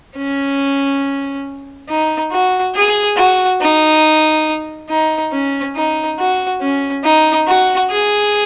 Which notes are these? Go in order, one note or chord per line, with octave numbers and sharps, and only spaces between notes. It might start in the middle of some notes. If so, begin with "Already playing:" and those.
C#4
D#4
F#4
G#4
F#4
D#4
D#4
C#4
D#4
F#4
C#4
D#4
F#4
G#4